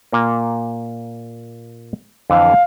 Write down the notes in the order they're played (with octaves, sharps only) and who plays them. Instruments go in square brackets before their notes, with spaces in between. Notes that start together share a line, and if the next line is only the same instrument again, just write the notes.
[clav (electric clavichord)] A#2 A#3
[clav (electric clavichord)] F2 D3 E3 [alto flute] F5